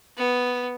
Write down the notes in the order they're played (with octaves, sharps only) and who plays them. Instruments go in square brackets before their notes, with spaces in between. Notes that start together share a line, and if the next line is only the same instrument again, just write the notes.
[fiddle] B3